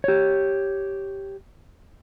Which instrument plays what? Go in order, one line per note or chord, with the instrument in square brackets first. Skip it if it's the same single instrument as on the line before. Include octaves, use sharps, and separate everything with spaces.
[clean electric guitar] G4 C#5